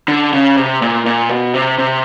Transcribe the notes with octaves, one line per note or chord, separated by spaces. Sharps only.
D3
C#3
C3
A#2
A#2
B2
C3
C3